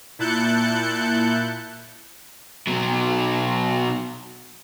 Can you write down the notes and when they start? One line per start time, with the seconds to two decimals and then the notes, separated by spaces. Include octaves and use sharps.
0.19 A#2 E4 A5 F#6 G6 C#7
2.67 B2 F#3